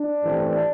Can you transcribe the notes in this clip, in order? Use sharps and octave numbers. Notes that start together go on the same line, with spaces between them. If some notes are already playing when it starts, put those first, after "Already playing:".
Already playing: D4
A1 G2 E3 A3 C4